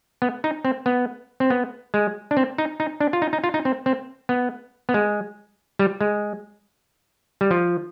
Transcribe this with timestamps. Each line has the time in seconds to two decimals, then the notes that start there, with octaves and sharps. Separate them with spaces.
0.22 B3
0.44 D#4
0.65 C4
0.86 B3
1.40 C4
1.50 B3
1.94 G#3
2.31 D4
2.37 C4
2.58 D#4
2.80 D#4
3.00 D4
3.13 F4
3.22 D#4
3.33 D#4
3.44 F4
3.54 D#4
3.65 C4
3.86 C4
4.29 B3
4.89 B3
4.94 G#3
5.79 G3
6.01 G#3
7.41 G3
7.51 F3